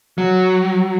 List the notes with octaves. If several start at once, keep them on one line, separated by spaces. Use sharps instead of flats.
F#3